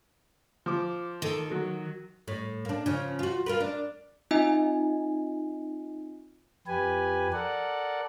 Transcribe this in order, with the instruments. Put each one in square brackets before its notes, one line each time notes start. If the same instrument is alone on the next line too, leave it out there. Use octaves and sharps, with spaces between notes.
[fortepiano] F3 D6
[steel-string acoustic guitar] D#3 [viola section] A4
[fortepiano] F#3 [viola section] F#4
[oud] A2
A#3 D4
C#3 F3
F4 F#4
F4 A#4 B4
D4
[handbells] C4 D#4 F4 D#5 E5 G#5
[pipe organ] F2 G4 B4 G#5
A4 A#4 D5 F#5